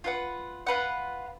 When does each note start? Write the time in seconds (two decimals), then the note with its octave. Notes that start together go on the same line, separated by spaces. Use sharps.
0.04 F4 B4 F#5
0.66 F4 B4 F#5